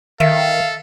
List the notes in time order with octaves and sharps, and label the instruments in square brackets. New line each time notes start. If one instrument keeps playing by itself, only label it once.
[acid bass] D#3 [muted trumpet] A4 [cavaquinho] E5 [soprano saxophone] F5